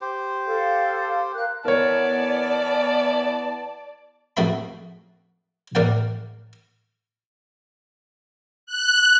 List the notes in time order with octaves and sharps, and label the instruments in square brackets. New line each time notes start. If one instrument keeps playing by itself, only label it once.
[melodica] G4 C5
[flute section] A4 F5
A#4 F5 F#6
[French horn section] E3 B3 [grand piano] A#4 C#5 [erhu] D5 [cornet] A5
[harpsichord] F2 A3 F#4 D#5 E5 B5
A1 A#4 D5 F#5 G5
[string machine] F#6